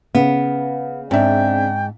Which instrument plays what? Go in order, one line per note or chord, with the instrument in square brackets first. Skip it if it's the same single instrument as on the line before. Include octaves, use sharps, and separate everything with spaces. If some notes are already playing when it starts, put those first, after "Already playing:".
[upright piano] C#3 [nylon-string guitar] B3
[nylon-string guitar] G#2 [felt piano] C4 D4 E5 [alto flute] G5